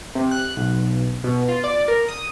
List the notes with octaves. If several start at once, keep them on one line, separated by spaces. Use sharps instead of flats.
C3
F#6
B1
B2
F4
D5
A#4
D#6